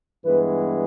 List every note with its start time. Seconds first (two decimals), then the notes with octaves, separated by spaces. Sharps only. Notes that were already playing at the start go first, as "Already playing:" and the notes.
0.24 G2 E3 G#3 B3 B4